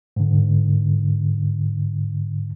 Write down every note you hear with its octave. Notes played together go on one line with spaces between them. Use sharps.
G#2 D3